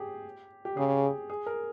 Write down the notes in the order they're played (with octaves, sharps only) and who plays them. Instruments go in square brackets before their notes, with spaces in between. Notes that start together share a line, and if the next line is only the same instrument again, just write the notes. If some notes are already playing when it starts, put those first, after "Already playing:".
Already playing: [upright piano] G4 G#4
G4
[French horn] C#3 [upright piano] G#4
[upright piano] G#4
A#4